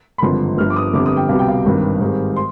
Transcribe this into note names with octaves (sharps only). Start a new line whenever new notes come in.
B5
G#1 G2 D3 F3 C6
G1 G2 F3 F6
D6
D#6
G1 F2 D3 G3 D6
D#6
G5
C2 B2 G3 F5
G5
F5
G#1 G2 D#3 G3
G#1 G#2 D#3 G3
C6